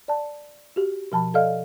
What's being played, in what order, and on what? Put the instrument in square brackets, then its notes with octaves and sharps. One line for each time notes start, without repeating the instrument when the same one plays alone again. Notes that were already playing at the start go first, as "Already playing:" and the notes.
[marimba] D5 A5
F#4 G4
B2 F3 A5 B5
A4 D5 D#5 F5 F6